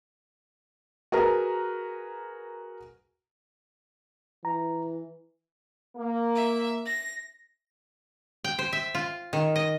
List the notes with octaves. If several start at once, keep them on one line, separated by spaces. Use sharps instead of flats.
F#4 G#4 A#4 B4 A#5
E3 A#5
A#3
E5
A#6
G5
C5
E5
F4
D#3
D#5